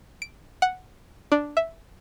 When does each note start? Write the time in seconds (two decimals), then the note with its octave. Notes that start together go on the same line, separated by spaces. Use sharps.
0.22 D7
0.62 F#5
1.32 D4
1.57 E5